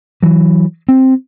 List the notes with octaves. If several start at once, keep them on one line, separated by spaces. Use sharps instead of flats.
E3 F#3
C4